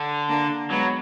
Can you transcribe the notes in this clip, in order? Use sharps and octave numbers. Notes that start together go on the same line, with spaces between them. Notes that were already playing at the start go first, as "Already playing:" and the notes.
Already playing: D3
A#3 D4
F#3 G#3 B3